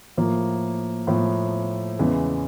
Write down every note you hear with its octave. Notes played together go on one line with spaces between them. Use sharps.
A2 F3 A#3
A2 F3 A#3
E2 C#3 E3 G#3